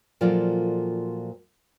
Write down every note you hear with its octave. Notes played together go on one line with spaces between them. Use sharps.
A#2 F3 F#3 F4 A4 D5